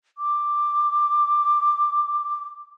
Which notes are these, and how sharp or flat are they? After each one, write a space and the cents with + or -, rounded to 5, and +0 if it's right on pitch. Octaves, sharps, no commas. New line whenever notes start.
D6 +10